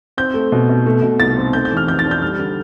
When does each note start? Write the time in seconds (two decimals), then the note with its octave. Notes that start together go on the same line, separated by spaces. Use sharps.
0.17 C4 G6
0.34 A3
0.52 B2
0.69 B2
0.86 A3
1.02 B2
1.19 C2 A6
1.36 C4
1.53 A3 G6
1.65 G6
1.71 E3
1.77 F6
1.88 F2 G6
1.99 A6
2.06 D4
2.11 G6
2.22 G3 F6
2.39 D3